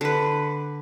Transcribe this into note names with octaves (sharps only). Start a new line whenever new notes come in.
D3 B4